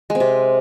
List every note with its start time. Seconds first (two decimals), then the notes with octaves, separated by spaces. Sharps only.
0.10 G#3
0.15 C4
0.20 C3